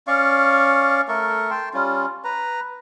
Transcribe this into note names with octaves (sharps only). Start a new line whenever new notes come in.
C#4 D5 F5 C#6
A3 A4 A#4 C#6
G5 A5 C6
G3 C#4 F4
B4 A#5